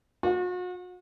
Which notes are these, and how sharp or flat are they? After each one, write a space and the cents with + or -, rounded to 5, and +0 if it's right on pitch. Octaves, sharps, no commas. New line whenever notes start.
F#4 -40